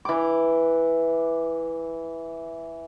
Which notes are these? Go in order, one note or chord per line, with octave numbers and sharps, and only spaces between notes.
E3 D6